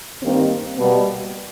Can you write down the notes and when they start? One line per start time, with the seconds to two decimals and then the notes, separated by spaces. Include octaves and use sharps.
0.22 G2 D#3 G3 A#3 C4
0.77 B2 G3 A#3 B3